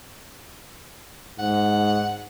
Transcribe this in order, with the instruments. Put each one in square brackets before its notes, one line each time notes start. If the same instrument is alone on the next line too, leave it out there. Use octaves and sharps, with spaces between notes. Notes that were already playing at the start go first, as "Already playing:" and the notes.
[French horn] G#2 [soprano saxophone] F#5